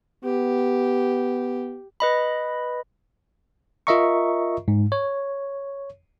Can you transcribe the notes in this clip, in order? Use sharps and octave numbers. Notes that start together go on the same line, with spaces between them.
B3 G4
B4 D#5 B5
F4 A#4 D#5 E5 A#5 C#6
G#2
C#5